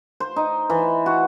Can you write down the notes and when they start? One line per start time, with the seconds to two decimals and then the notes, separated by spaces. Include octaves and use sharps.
0.20 C5
0.36 D#4
0.70 E3
1.06 F#4